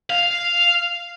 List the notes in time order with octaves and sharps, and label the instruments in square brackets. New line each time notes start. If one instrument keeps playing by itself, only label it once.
[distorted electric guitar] F5